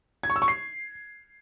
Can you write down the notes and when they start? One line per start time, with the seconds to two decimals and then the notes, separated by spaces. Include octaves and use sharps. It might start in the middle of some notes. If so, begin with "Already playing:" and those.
0.23 G#6
0.30 C#6
0.36 E6
0.42 C#6
0.48 C7